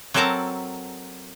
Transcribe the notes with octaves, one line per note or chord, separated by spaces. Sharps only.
F#3 C4 A4 A#4 A5 A#5